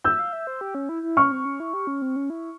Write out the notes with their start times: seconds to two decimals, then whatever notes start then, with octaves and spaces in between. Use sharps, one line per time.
0.04 E5 E6 G6
0.19 F5
0.33 E5
0.47 C5
0.61 G4
0.75 C#4
0.89 E4
1.03 E4
1.17 C#4 C#6 F6
1.32 C4
1.45 C#4
1.60 E4
1.73 G4
1.87 C#4
2.02 C4
2.16 C#4
2.30 E4